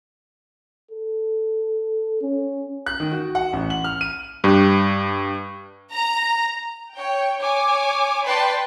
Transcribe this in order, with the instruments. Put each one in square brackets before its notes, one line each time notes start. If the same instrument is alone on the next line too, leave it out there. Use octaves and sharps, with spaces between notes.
[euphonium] A4
C#4
[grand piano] F#6
D#3
F#4
F#5
A1
F#7
F6
D#7
[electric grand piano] G2 G4
[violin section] A#5
C#5 G5
C#5 G#5 D6
B4 D5 G5 A5 B5 C6